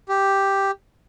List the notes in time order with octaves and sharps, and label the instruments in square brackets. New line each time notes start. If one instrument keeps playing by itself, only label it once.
[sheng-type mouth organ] G4